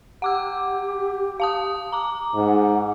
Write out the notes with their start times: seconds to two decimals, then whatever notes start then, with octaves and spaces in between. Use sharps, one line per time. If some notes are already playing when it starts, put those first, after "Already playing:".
0.22 G4 F#5 D6 E6
1.40 F5 A5 D#6
1.92 A#5 D6
2.35 G#2 F#5